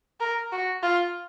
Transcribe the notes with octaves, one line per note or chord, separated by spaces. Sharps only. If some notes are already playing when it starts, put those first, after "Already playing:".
A#4
F#4
F4